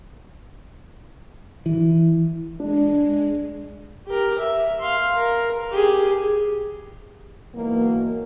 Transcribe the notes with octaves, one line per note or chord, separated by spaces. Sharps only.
E3
G#3 D4
G4 A#4
E5
F5 C6
A#4
G4 G#4
G#2 B2 E3 F#3 A#3